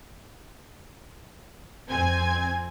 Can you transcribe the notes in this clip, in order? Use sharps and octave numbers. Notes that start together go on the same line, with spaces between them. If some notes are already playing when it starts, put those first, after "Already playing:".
F2 C4 G#5 G#6